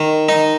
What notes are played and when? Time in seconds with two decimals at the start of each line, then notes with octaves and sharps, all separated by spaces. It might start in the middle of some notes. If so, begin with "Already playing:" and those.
Already playing: D#3
0.29 D#4